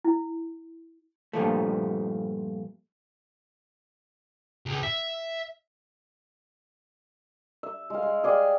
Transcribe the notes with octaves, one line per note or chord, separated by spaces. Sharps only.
E4
G2 A#2 F3 A3
C#2
E5
E5
G#3 F5
G#3
G#4 D5 F5 G5